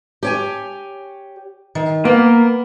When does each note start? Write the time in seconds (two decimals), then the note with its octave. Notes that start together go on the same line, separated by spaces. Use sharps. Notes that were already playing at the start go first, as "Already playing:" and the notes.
0.23 G4 C#5 G#5
1.75 D#3
2.05 A#3 B3